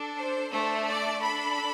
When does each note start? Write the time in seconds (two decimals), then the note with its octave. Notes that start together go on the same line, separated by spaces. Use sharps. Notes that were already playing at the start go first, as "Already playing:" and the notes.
Already playing: D4 A4
0.16 C5
0.51 A3 D4 A4
0.87 D5
1.21 D4 A4 B5